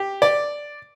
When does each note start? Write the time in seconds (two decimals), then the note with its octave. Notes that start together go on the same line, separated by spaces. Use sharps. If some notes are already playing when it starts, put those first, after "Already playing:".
Already playing: G4
0.22 D5